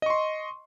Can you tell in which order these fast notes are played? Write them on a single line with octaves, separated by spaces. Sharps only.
D#5 C#6 C6